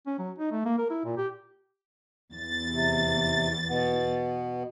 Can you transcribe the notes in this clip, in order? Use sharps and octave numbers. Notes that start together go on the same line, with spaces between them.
C#4
F#3
D#4
A3
A#3
A#4
E4
A#2
G4
E2 A6
C3
B2 B3